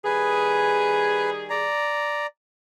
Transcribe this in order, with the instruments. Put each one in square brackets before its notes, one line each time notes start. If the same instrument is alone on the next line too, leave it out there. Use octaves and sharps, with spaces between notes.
[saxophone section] D#3 G3 G#4 [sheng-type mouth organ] B4 G#5
[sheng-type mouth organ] D5 A#5